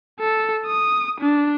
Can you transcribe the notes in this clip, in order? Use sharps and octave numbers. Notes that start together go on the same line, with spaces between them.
A4
D#6
D4